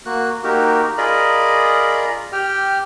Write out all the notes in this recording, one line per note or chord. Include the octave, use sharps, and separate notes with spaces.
A#3 F#4 F#6
A#3 D#4 F#4 G4 A#4
F4 G#4 A#4 D5 D#5 B5
G4 G5 F6